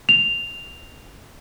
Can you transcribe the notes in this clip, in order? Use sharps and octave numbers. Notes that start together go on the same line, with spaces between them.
F7